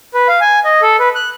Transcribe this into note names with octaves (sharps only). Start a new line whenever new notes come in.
B4
F5
G#5
D#5
A4
B4
F#6